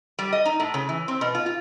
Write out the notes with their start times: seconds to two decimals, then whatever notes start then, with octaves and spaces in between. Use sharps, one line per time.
0.19 G3
0.33 D#5
0.45 D#4
0.60 A2
0.74 C#3
0.89 E3
1.08 C4
1.21 B2
1.35 F4
1.46 F4